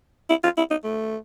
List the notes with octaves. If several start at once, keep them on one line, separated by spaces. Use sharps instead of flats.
E4
F4
E4
D#4
A3